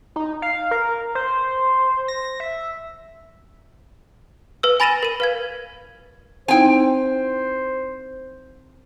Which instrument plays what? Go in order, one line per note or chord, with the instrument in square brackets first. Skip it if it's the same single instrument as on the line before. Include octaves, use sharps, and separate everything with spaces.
[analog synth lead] D#4
F5
A#4
C5
A#6
E5
[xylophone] B4 E6
G#5 B5 A6 A#6 D#7 E7
A#4 D#7
B4 F5 G#6
[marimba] C4 D#4 E4 [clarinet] C5 [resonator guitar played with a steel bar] G5 G#5